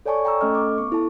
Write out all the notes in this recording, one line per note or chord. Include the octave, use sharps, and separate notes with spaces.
A4 C#5 D5 G#5 A5 C#6
G5 A#5 C#6 E6
A3 C#4 A4 D#5 F6
D6
B3 C#6
E4 A4 A5